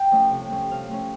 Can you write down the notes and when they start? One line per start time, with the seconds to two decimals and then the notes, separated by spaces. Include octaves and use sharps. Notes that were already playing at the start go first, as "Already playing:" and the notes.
Already playing: G5
0.11 F3 A3 C#4
0.31 C3
0.51 F3 A3 C#4
0.71 C3 F5
0.91 F3 A3 C#4